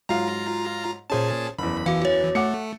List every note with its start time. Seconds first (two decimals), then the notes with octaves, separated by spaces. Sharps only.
0.09 G#2 F#3 F4 F5 A#5
1.10 A#2 C#4 G#4 C5 A5
1.59 F#1 E2 B5
1.86 E3 F#4 F5
2.02 F#4 C#5
2.35 A3 F#5 D6 C#7